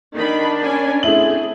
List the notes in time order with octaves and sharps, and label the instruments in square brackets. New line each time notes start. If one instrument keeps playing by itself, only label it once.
[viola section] D#3 D#4 B5 [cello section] D4
[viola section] C#4 G#5
[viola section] A3 C4 G#4 [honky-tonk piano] E4 F#7